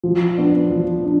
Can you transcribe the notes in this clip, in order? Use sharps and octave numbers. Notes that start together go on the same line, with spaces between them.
F3
B3 D4
F3
D4